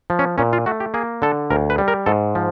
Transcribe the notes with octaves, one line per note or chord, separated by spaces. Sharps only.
F3
C#4
A#2 C#4
F4
A3 F#4
G4
A#3 G#4
D3 A4
D2 A#4
B4
G3
A#4
G#2 A4
F3